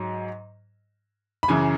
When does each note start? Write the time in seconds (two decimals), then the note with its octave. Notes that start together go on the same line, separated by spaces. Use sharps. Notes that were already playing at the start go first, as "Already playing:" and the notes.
Already playing: G#2 F#3
1.43 B5
1.48 F#2 C#3 E3 G#5